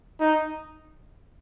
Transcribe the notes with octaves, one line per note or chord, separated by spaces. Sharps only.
D#4